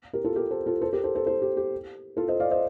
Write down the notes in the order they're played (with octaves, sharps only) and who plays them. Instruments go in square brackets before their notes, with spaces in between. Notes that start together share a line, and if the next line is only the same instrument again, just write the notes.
[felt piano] G4 A#4
F4 A4
G4 A#4
A4 C5
F4 A4
A4 C5
G4 A#4
A4 C5
A4 C5
A4 C5
G4
G4
F4 A4
C5 D#5
D5 F5
C5 D#5